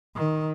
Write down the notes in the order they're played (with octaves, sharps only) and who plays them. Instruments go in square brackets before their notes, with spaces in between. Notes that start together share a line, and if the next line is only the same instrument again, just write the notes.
[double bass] D#3